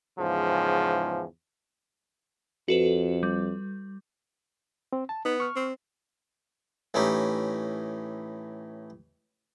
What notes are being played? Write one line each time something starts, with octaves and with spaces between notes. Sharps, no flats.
E2 G#2 C#3 F3
F2 F#4 A4 B4
G3
C4
A5
B3 D#4
C#6 F6
C4
A2 E3 C#4 D#4 G4